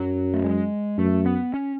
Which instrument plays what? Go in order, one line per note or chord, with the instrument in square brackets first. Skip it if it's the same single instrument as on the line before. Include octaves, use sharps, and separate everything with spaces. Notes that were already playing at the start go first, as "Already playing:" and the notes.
Already playing: [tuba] F#2 [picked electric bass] F#3
[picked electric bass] A3
G#3
[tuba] F#2 [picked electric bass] A3
[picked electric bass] B3
C#4